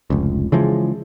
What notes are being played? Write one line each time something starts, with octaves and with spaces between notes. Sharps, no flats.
F1 C#2
C#3 E3 F3 G#3